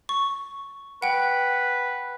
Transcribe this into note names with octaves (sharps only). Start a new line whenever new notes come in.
C#6
B4 F#5 G5